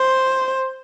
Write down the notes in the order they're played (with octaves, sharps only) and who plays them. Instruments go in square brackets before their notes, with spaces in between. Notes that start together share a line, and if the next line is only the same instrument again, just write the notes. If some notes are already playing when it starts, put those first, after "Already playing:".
Already playing: [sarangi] C5